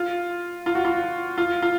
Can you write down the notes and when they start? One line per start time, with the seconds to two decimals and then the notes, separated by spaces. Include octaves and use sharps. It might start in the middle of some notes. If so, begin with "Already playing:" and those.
Already playing: F4
0.66 F4
0.75 F#4
0.85 F4
1.38 F4
1.62 F4